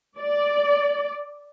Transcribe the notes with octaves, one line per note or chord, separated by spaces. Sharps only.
D5